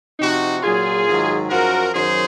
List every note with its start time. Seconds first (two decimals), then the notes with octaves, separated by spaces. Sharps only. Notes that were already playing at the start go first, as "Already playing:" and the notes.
0.19 C3 F3 D#4 F#4
0.63 A#2 F#3 F4 G#4
1.07 G#2 D#3 F#3
1.50 F#2 F3 F#4 A#4
1.94 F#2 D#3 F#3 G#4 C5